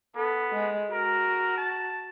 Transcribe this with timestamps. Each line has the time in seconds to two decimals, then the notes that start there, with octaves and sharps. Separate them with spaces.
0.16 B3 A4
0.53 G#3
0.92 F#4 A#4
1.58 A5